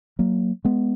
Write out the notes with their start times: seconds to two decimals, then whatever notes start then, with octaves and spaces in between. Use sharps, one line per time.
0.19 F#3 A#3
0.65 G#3 B3